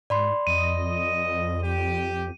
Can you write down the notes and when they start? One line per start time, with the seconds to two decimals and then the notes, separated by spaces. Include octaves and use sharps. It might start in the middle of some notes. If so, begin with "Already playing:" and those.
0.10 G#2 D5 B5 C6
0.47 F2 D#5 D#7
1.62 G4